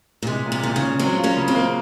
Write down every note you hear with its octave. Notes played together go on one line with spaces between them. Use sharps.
A#2
C3 G#3
A#2
C3
A#2 D#3
C#3
C#4
F#3 G#3 C4
F4
A#3 C#4
C#3
G#3 C4
A#3